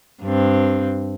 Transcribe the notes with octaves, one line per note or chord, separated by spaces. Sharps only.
G2 C4